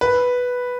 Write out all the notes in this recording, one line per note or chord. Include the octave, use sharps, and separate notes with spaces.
B4